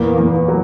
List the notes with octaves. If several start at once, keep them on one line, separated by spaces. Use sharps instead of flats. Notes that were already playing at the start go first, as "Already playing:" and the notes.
Already playing: E2 A#2 A#3 B3
E2
F#3